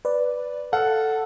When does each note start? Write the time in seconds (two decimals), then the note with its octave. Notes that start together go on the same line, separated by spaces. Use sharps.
0.05 B4 D5
0.73 A4 F5 F#5